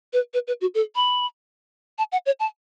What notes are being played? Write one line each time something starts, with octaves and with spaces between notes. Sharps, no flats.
B4
B4
B4
F#4
A4
B5
A5
F#5
C#5
A5